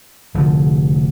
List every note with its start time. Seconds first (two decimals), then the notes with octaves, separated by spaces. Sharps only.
0.34 F1 D3 F3